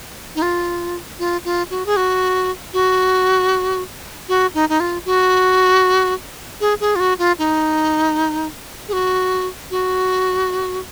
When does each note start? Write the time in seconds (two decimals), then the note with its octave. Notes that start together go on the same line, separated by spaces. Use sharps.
0.35 D#4
0.42 F4
1.19 F4
1.45 F4
1.70 F#4
1.86 G#4
1.96 F#4
2.73 F#4
4.29 F#4
4.54 D#4
4.69 D#4
4.80 F4
5.06 F#4
6.61 G#4
6.80 G#4
6.96 F4
7.00 F#4
7.19 F4
7.38 D#4
8.88 G#4
8.93 F#4
9.71 F#4